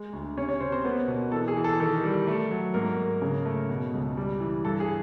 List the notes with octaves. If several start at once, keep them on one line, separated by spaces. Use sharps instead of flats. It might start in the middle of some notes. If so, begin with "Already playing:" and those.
Already playing: G#3
D2
C3 C#4 C#5
C#4 C#5
C3 C4 C5
C4 C5
A#3 B3 B4
B2
E3 A4
G#4
E3
A4
D#3 A4
G3
A3
F#3
G#2 A#3 A#4
G#2
C#3
A3
B2
C#2
G3
E3
G2 A4
G#4